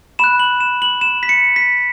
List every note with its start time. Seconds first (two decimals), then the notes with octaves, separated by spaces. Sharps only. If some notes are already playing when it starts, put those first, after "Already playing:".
0.19 B5 F#6 E7
0.40 F#7
0.60 E7
0.82 F#7
1.01 E7
1.23 B6
1.29 C#7
1.56 B6